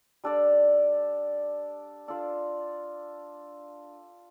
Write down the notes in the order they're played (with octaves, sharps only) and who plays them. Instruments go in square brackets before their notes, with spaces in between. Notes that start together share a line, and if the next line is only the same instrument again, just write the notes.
[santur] G3 D4 A4 D5
D4 F4 A4 D5